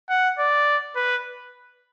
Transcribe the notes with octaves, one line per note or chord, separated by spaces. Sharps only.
F#5
D5
B4